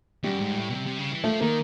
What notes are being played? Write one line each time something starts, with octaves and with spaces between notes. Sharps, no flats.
F#2 G3
G#2
A#2
A2
B2
C3
C3
C#3
E3
F3 A3
D#3 A#3